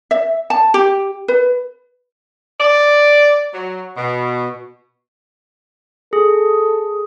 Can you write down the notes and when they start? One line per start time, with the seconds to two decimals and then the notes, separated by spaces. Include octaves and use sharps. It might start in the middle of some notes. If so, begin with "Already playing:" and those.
0.11 E5
0.50 A5
0.74 G4
1.28 B4
2.61 D5
3.54 F#3
3.97 B2
6.13 G#4 A4